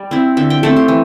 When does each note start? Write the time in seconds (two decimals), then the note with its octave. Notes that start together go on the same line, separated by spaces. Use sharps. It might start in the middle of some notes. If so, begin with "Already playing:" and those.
Already playing: G3 D5
0.11 C4 E4
0.37 D3 E5
0.50 G5
0.63 A3 C4 A4
0.77 G4
0.88 E3